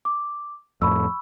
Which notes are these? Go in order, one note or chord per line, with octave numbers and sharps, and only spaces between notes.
D6
F2 A2 B5 C#6 E6